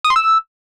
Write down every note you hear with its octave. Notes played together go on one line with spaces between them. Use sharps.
D#6
C6
E6